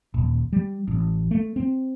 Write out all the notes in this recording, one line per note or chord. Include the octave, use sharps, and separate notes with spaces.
D#1
G3
A1
A3
C4